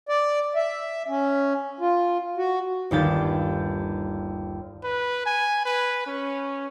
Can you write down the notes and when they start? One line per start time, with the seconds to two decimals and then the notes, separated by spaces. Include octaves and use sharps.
0.09 D5
0.56 E5
1.08 C#4
1.80 F4
2.37 F#4
2.91 G1 D#2 G4 A6
4.84 B4
5.26 G#5
5.65 B4
6.07 C#4